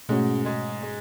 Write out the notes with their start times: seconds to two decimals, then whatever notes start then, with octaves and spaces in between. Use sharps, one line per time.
0.09 G#2 B2 G#3 A3 C#4 F#4
0.45 G#2 G#3
0.82 G#3